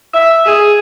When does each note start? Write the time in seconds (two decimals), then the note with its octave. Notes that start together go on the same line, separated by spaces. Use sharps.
0.14 E5
0.46 G#4